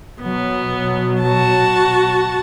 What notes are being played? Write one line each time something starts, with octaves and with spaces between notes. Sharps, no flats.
B2 F#3 B3
F#4 A5